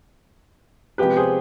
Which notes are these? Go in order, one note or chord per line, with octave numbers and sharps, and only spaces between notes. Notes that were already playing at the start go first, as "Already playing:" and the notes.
C3 F3 G#3 B3 G4 B4
G#4 C5